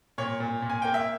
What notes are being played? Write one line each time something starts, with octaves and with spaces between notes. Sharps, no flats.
A#2 C#5
A#2
A#2
G#5
A#3 G5
E5